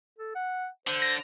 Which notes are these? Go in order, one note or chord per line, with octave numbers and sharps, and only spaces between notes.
A4
F#5
D3 C5
A#6